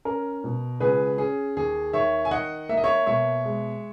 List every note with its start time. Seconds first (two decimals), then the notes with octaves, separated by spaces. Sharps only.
0.05 C#4 A#4
0.44 B2
0.80 C#2 G#4 B4
1.18 C#4 G#4
1.56 D#2 G#4
1.93 D#3 C#5 E5
2.25 G#5
2.31 D#3 D#5 F#5
2.69 A#3 E5
2.77 D#5
2.84 C#5 E5
3.06 B2 C#5 E5
3.45 G#3